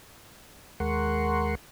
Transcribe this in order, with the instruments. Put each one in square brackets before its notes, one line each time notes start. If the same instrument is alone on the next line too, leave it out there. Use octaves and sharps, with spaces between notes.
[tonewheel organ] D#2 G#3 A#4 F#5 C6 C#6